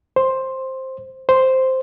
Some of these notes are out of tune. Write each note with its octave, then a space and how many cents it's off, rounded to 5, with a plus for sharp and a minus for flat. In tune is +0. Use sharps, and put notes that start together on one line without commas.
C5 +10
C5 +0